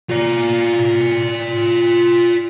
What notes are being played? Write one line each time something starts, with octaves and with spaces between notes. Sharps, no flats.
F4 D5